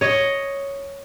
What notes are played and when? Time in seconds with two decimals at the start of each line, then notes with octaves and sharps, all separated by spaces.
0.01 C#5 D#5